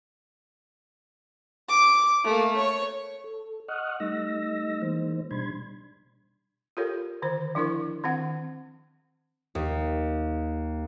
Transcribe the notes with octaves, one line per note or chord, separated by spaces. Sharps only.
D6
A3 A#3
C#5
A4
D#5 F#5 C#6 D#6 F6 F#6
G3 A3 D#4 D#5 E6 A#6
E3 G#3 A#3 D#4 C5
B2 G3 D4 B5 C6 G#6
F4 G4 A4 A#4 C#5
D3 D#3 C5
F3 D4 E4 A#4 C#6
D#3 C4 F#5
D#2